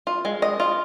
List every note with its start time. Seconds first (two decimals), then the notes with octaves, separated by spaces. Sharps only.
0.07 F4
0.25 G#3
0.42 D#5
0.60 F4